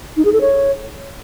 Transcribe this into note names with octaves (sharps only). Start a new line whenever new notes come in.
D#4
G#4
A4
C#5